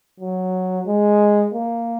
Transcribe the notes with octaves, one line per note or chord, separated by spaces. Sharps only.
F#3
G#3
A#3